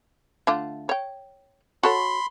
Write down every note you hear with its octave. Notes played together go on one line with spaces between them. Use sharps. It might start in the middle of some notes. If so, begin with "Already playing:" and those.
D3 A3 F4
C#5 G5
F#4 A4 C#5 B5 C6